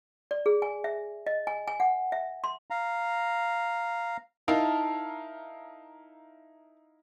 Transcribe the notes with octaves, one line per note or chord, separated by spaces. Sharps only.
D5
G#4
G#5
E5
D#5
G#5
G#5
F#5
E5
C6
F5 A#5
D#4 E4 A#4 F5 A5